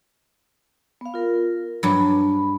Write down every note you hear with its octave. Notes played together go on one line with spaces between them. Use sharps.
B3 F5
F4 A#4
G2 F#3 B5